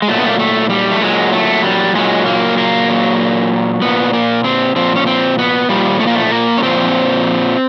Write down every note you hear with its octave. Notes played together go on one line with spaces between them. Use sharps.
G#3
A#2 F#3 A3
B3
A#3
A3
G3
A3
A#2 F#3 G#3
A3
G3
A#2 F#3 G#3
A#3
A#3
A#2 F#3
A#2 F3 B3
A#3
C4
A#2 F3 C4
C#4
C4
B3
A#2 F3 G3
A3
A#3
A3
A#3
C#4
A#2 F3 C4